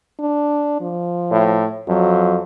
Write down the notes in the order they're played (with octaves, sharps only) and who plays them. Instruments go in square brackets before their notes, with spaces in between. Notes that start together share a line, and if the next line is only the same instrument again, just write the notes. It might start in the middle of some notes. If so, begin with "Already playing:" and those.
[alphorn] D4
F3
[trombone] A2
[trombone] F2 [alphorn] F#3